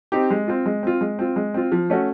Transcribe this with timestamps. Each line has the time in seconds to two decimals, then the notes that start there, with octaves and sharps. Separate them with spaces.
0.12 C4 D#4 G4
0.31 G#3
0.48 C4 F4
0.66 G#3
0.83 C4 F4
1.01 G#3
1.19 C4 F4
1.36 G#3
1.54 C4 F4
1.72 F3
1.90 A3 C#4 F#4